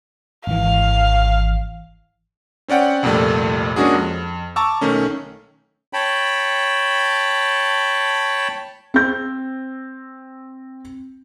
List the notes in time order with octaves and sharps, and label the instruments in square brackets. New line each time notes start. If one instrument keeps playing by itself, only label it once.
[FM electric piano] G#1 E3 [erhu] F5
[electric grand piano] C4 C#4 D5 F#5 G5
C2 F2 A#2 G3 A3
G#3 A#3 C#4 D4 F#4 G#4
F2
A5 A#5 C#6 D6 E6
B1 D#3 A3 C#4
[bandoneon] C#5 G5 A5 B5
[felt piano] C4 G6